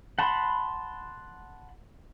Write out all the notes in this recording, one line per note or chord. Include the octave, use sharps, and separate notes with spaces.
F#5 A5 B5 C6